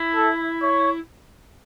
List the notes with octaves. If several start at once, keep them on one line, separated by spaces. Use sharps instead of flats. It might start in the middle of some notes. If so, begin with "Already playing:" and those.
Already playing: E4
A4
C#5